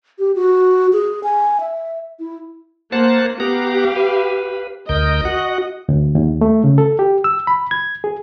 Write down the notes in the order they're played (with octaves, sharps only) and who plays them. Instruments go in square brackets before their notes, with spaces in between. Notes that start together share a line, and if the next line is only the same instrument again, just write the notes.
[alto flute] G4
F#4
G#4
G#5
E5
E4
[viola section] A#3 [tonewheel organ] C5 F#5 A5
[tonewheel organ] B3 F#5 A#5 [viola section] G4 F5
[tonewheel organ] B4
[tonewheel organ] D2 A#4 G6 [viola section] D#5
[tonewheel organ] F#4 F#5
[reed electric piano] D2
D#2
A3
C#3
A4
G4
E6
B5
G#6
G#4